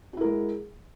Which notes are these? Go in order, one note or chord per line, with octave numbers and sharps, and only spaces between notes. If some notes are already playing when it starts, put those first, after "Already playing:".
G#3 E4 F#4 A#4